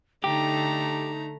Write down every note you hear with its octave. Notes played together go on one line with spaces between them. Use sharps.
D3 A3 D#4 G4 A#5